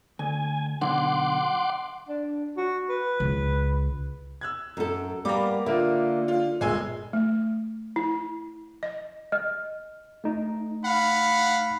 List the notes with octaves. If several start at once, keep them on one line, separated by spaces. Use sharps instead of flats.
D2 G#5
B1 D3 F#5 C6 D6
D4
F#4
B4
C#2
E6 F#6 G#6
F#2 A4
G3 A#3 B3 A#5 D6
D3 F4 A#4 E5
F4
G1 A#2 G#3 G#5 E6
A3
E4
D#5
D#5 F6
A3 D#4
F5 F#5 B5